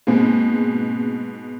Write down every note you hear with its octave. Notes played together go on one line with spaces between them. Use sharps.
G#2 B2 G#3 A#3 C4